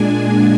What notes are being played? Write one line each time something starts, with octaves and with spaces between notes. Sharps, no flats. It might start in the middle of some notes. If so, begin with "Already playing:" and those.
Already playing: A#2 G#3 D4 G#5